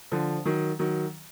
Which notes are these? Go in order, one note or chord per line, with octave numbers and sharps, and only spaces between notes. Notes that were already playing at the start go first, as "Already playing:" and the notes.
D3 F3
D#3 F#3
D#3 F#3